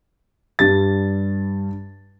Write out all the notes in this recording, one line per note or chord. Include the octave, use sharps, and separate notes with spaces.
G2 G3 A6